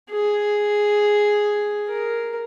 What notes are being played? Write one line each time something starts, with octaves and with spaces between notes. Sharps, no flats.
G#4
A#4